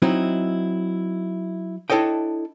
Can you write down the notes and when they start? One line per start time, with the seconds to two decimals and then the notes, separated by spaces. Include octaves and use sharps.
0.02 F#3 C4 D#4 E4
1.90 D4 E4 A4 C#5 D#5 G5